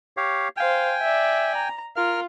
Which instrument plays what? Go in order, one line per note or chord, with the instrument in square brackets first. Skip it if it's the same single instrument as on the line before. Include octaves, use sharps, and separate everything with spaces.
[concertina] G4 C#5 F5
[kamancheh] C5 F5 [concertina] G5 G#5
[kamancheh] D5 E5
A#5
[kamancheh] F4 [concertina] A#4 F6